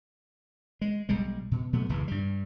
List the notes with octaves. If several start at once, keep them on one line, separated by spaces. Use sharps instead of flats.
G#3
B1 G3 G#3
B2
B2 F#3 A3 B3
F1 C#2 C#3 E3
G2 G3